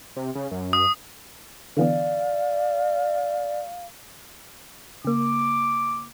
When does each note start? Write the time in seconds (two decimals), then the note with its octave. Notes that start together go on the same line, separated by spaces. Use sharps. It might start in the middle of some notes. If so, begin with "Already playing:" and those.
0.16 C3
0.35 C#3
0.51 F#2
0.73 D#6
1.77 D3 E3 B3 D5 F5
5.05 C#3 A#3 D6